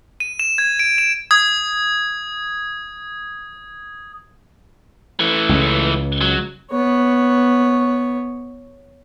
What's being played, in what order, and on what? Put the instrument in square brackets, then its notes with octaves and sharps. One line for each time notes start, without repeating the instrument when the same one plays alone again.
[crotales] D#7
E7
G#6
D7
E7
D#6 G#6
[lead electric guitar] E3 A3
[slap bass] C#2 C#3
[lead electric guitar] F#3
[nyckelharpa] B3 C#5